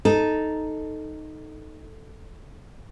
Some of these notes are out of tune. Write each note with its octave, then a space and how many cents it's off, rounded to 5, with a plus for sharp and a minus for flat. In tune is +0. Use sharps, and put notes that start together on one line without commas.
D#4 +0 A4 +0